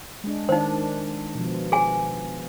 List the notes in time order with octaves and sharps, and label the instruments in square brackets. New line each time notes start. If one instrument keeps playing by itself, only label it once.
[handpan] G#3 D4
[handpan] D#3 D4 [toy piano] D#4 C5
[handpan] B2 F3
[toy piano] G#4 G#5